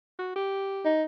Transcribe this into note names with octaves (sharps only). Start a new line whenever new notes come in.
F#4
G4
D#4